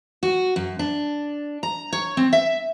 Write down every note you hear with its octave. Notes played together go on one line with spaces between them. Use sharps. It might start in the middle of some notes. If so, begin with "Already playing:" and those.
F#4
F#2
D4
A#5
C#5
C4
E5